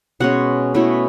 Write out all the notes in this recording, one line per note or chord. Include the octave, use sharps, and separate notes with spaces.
B2 G#3 C#4 F#5
B2 A3 C#4 E4